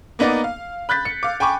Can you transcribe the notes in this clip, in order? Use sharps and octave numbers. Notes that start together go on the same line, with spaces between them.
A#3 B3 D#4 D5
F5
B5 F#6 G6 A6 B6
C#7
F5 D6
G5 G#5 B5 C#6 D6